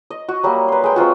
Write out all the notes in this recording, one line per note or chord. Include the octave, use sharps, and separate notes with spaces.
D#5
F#4
F#3 G3 A#3
B4 C6
G#3 G5
F#3 C4 F4 F#4